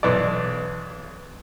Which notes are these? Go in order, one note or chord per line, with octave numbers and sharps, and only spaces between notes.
B1 E3 D5